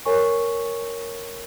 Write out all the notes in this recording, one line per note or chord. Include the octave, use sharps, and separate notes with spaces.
A#4 C#5 G#5 C#6